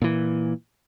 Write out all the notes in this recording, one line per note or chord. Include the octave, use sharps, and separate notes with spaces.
A#2 E3